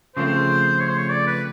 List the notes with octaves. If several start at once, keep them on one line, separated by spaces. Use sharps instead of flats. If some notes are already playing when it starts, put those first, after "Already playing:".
C#3 F3 A3 C4 C5
C#5
C5
C#5
D5
B4